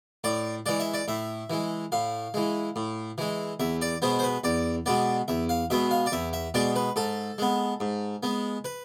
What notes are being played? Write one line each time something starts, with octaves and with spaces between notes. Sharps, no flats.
A2 D5
E3 G#3 D5
E5
D5
A2 E5
E3 G#3
A2 F5
E3 G#3
A2
E3 G#3
E2 E5
D5
B2 G#3 B3 C5
C5
B4
E2 D5
B2 G#3 B3 D5
E2 E5
F5
B2 G#3 B3 E5
F5
D5
E2 E5
E5
B2 G#3 B3 D5
B4
G#2 A4
G#3 B3
G#2
G#3 B3
B4